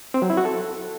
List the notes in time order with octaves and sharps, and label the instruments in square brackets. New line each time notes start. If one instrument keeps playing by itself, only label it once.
[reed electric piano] C4
F#3
E4
F#4
A4